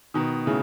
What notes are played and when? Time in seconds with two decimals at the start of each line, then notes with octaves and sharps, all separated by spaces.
0.14 B2 D#3
0.46 A2 C#3